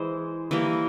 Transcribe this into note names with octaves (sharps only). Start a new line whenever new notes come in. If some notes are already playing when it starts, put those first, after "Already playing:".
Already playing: E3 G#3 C5
E3 G3 A#3